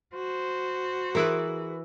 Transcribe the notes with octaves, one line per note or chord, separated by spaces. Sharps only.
F#4 C5
E3 E4 G#4 A#4 B4